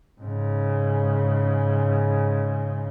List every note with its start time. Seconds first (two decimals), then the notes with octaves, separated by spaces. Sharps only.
0.21 G#2 C#3